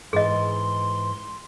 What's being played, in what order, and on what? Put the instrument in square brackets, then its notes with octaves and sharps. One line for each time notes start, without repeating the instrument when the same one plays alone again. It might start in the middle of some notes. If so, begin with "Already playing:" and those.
[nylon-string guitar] G#2 E3 [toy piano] G#4 D#5 [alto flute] C6